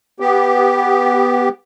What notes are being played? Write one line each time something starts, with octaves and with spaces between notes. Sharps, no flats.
B3 G4